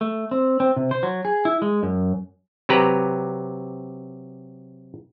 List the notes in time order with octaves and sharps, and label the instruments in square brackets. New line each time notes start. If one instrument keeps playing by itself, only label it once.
[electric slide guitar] A3
C4
C4
C3
C5
F#3
G#4
E4
G#3
F#2
[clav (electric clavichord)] C3 F#3 G4 B4 A#5